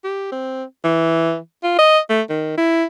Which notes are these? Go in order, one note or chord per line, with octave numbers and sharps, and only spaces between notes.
G4
C4
E3
F4
D#5
A3
D#3
E4